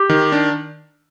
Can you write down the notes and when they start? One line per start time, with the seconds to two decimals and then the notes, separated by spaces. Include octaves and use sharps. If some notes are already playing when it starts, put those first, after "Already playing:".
Already playing: G4
0.09 D#3
0.32 D4